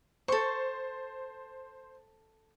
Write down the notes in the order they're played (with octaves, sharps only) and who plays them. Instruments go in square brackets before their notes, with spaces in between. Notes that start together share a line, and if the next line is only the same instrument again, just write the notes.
[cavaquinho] A4 C#6 [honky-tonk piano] C5